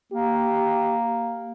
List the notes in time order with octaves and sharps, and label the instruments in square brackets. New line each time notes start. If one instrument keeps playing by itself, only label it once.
[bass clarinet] A#3 [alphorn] G4